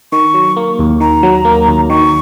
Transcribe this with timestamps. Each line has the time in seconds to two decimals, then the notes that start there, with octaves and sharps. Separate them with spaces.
0.12 D#3 C#6
0.34 F#3
0.56 A#3
0.79 D#2
1.00 D#3 A#5
1.23 F#3
1.45 A#3
1.68 D#2
1.90 D#3 C#6